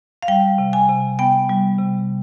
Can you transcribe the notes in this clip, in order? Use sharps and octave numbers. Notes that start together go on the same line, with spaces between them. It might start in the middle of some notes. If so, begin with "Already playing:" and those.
F5
G3 G5
C3
G#5
C3
B3 G5
G3
C3